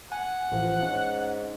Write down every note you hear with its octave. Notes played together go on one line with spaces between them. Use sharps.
F#5 G#5
A1 F3
G#2 C#4